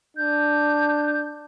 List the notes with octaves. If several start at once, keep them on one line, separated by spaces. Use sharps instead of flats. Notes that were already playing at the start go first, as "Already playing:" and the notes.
D4 G6